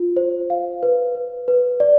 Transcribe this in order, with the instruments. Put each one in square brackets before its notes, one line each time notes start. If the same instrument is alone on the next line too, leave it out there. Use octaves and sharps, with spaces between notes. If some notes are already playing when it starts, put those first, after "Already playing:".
Already playing: [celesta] F4
C5
F5
B4
B4
B4
D5